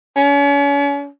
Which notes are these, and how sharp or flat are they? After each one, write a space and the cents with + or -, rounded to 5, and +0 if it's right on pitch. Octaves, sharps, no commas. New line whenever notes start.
C#4 +40